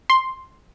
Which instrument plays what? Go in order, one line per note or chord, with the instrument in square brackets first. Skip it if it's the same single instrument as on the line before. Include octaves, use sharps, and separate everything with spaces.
[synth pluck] C6